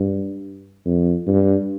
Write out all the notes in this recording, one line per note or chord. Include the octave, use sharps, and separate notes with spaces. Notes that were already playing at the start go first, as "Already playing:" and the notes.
Already playing: G2
F2
G2